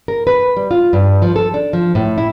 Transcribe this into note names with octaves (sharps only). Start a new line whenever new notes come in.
A#4
B4
G3
F4
G2
F3
A4
D4
F3
A2
E4